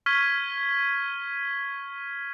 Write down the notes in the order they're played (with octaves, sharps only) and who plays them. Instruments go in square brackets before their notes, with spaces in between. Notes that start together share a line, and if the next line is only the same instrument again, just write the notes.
[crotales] C#6 F6 G#6 B6 D#7 G7